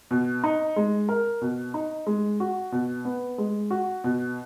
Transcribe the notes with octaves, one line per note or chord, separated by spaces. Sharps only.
B2
D#4
G#3
A#4
B2
D#4
G#3
F#4
B2
B3
G#3
F#4
B2